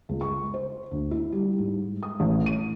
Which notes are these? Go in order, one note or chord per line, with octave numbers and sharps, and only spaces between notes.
C#2
C#6
C5
D2
E4
G3
G#2
D#6
A1
D#7